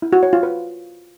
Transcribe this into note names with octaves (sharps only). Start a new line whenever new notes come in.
E4
F#4
C#5
F4
B4